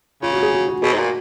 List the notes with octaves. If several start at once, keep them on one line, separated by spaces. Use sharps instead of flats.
C#3 F4
F#4
G#4
F#4
F#4
B2 G#4
G#2
A#2 F#4